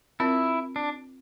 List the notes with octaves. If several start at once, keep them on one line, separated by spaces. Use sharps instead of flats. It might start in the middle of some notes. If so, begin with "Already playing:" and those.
C4 E4 F4 A#4
D4